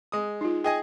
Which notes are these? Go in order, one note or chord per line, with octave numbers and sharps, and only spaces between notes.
G#3 D#6
D#4 F4
G#4 D#5 G5 G#5